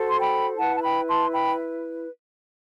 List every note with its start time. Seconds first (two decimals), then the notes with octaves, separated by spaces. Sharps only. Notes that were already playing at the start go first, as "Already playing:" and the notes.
Already playing: F#4 A4 C5
0.09 C6
0.19 G5 B5
0.57 E4 B4 F#5 A5
0.77 A5
0.83 G5 B5
1.08 A5 C6
1.33 G5 B5